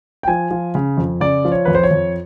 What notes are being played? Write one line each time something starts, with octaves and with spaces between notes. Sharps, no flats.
G5
F3 G#5
F3
C#3
F2
C#3 D5
F3
C#5
F2 B4
C5
C#5
F2